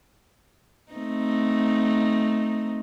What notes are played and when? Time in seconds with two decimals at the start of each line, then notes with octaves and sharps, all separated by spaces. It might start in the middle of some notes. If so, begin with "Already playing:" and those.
0.92 A3 C4 D#4